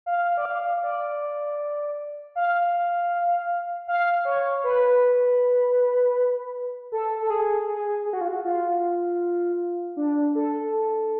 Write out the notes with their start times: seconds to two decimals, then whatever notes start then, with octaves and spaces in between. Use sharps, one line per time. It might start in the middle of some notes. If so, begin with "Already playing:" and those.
0.06 F5
0.37 D5
0.45 F5
0.83 D5
2.35 F5
3.88 F5
4.25 C#5
4.64 B4
6.92 A4
7.22 A4
7.30 G#4
7.68 G#4
8.06 G#4
8.13 F#4
8.21 F4
8.28 F#4
8.45 F4
9.97 D4
10.35 A4